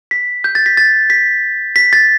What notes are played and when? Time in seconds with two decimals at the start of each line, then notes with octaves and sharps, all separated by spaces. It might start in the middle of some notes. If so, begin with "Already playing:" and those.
0.11 B6
0.44 G6
0.55 A6
0.66 B6
0.77 A6
1.10 B6
1.76 B6
1.93 A6